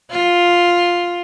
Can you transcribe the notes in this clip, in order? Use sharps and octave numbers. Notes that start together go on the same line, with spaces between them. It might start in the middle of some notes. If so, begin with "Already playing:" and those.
F4